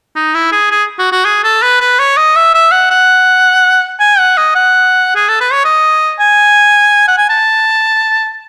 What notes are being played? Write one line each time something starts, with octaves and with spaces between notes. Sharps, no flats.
D#4
E4
G#4
G#4
F#4
F#4
G#4
A4
B4
B4
C#5
D#5
E5
E5
F#5
F#5
G#5
F#5
D#5
F#5
G#4
A4
B4
C#5
D#5
G#5
F#5
G#5
A5